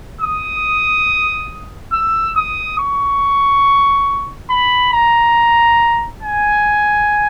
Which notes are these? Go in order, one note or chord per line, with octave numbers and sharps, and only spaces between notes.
D#6
E6
D#6
C#6
B5
A#5
G#5